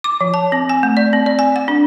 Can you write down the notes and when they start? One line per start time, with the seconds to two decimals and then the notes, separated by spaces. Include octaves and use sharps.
0.04 D6
0.21 F3
0.34 A5
0.52 C4
0.69 G#5
0.83 A3
0.97 D5
1.13 C4
1.26 D5
1.39 G#5
1.56 F#5
1.68 D4